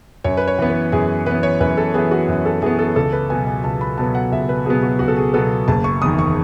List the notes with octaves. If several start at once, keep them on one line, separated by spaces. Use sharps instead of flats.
F#2 C#5
B4
C#5
E3 B3
B4
F#2 G#4
E3 B3 B4
C#5
F#2 B4
A4
E3 B3 G#4
F#4
F#2
A4
E3 B3 G#4
A4
C#2 A4
B4
B2 F#3 B3 G#5
G#5
C#2 A5
B5
B2 F#3 B3 A5
F#5
C#2 E5
B4
B2 F#3 B3 G#4
F#4
C#2 F#4
A4
G#4
B2 F#3 B3 A4
F#1 A5
C#6
E2 D#3 D#6
C#6